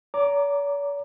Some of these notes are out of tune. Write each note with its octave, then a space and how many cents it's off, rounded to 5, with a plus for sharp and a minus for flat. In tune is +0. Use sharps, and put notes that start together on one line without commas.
C#5 +45 A#5 +0 D6 +0